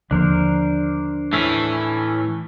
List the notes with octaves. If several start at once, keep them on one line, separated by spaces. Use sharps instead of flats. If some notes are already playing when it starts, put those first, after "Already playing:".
D#2 D3 F3 D4 A#4 C5
A2 E3 A3 C#4